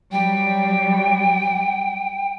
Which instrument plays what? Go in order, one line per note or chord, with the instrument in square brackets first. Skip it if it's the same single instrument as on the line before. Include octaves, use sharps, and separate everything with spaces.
[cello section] F#3 G3 [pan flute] G5